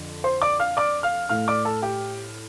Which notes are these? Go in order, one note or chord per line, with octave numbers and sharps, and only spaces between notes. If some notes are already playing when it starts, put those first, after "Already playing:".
Already playing: F2 D3
C5 C6
D5 D6
F5 F6
D5 D6
F5 F6
A2 A3 F5 F6
D5 D6
A4 A5
G4 G5